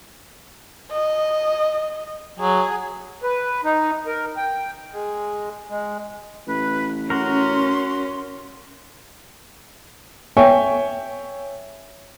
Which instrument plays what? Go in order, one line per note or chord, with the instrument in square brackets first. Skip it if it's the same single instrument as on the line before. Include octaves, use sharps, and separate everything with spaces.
[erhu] D#5
[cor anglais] F#3 [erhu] G#4
[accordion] B4
D#4
A#4
G5
G#3
G#3
[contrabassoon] A1 [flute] B4
[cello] C#4 [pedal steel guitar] F#4 A#4 [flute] C6
[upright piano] C#5 E5 G5 G#5 C#6